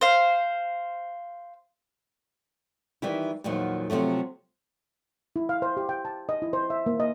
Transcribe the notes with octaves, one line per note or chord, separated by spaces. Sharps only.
C5 F5
D#3 E3 G3 E4
E2 A#2 D#3 F3 F#3
C3 F3 F#3 A3
E4
F5
C5
G4
G5
A5
D#5
E4
C5
E5
A#3
D#5